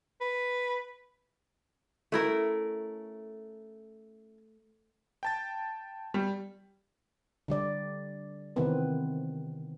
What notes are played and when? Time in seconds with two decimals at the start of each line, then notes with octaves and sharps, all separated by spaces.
0.21 B4
2.12 A3 C#4 E4 A#4
5.23 G5 A5 A6
6.14 G3
7.48 D3 G3 D5
8.56 C3 D#3 E3 B3 C4 B4